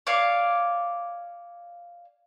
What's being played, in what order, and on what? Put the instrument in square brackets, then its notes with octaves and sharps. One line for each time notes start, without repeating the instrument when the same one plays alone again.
[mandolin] C#5 D5 F5